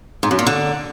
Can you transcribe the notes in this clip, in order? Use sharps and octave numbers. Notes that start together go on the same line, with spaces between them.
G#2
F#2
A#2
D3